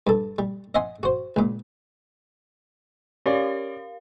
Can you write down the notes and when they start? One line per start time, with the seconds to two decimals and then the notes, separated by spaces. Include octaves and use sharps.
0.07 G2 A4
0.39 G3
0.75 D#5 E5 F#5 G#5 C6
1.03 F#4 C5
1.36 C#2 A#2
3.26 C#4 G4 A#4 D5 F5